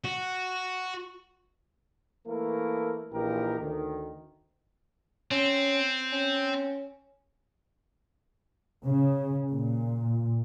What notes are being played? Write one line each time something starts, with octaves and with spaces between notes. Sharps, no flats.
F#4
E3 A3 A#3 E4 A#4
A#1 A#2 E3 D#4 G4 A#4
D2 D#3
C4 C#4
C#4
C#3
A#2